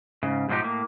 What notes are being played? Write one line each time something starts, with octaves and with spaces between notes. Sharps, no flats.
G#2 C#3
G#2 B2 F3 D4 D#4 G4
A2 A#3